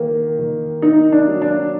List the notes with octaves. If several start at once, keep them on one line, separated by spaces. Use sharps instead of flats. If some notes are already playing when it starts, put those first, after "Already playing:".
Already playing: D#3 A#3
D#3
A#3 D#4
D4
F#3
D4